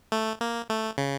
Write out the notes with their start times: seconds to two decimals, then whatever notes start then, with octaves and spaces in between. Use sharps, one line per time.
0.12 A3
0.41 A#3
0.70 A3
0.98 C#3